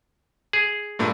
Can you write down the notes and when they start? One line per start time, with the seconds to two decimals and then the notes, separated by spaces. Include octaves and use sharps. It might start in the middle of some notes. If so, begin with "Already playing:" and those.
0.53 G#4
0.99 G2 A#2 A3